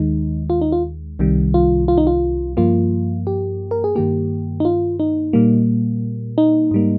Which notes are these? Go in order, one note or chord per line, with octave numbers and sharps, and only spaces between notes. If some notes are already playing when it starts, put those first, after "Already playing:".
Already playing: D#2 D#3 G#3 D#4
F4
D#4
F4
C2 C3 D#3 G3
F4
F4
D#4
F4
G2 F3 A#3 F4
G4
A#4
G#4
G2 D#3 A#3 G4
D#4
F4
D#4
A#2 G3 A#3
D#4
G#2 G3 A#3